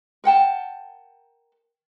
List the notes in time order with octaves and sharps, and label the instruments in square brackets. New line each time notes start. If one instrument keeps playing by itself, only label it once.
[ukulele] A#4 F#5 G5 A5